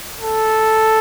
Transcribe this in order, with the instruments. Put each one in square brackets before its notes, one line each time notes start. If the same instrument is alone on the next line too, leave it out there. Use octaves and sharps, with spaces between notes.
[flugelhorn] A4